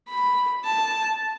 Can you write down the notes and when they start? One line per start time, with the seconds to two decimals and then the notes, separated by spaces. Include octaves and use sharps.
0.09 B5
0.65 A5